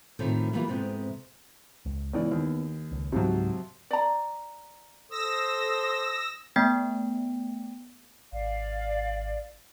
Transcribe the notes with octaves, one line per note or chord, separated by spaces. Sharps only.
A2 C3 D#3 F3 A3
E3 F#3 G3 A#3 B3 F4
F2 G#2 C3 B3
C#2
C#2 E3 B3 D5
D#2
C#2
C#2 G#2 C3 F3 F#3
D5 A#5
A4 C5 D#6 E6 A#6
A3 B3 G5
G#1 D5 F5